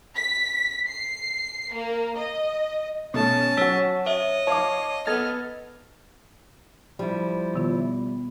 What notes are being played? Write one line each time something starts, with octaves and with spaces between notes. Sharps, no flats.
B6
C7
A#3
D#5
B2 A3 C#4 A5
F#3 F#4 C#5 E6 B6
C#5 D#5 E5
C#5 F5 A5 D6
B3 A4 D#5 F6 G#6 A6
F3 G3 E4
B2 D#3 B3 F4